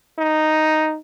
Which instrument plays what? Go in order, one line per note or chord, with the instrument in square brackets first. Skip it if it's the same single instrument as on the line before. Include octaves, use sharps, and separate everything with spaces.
[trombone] D#4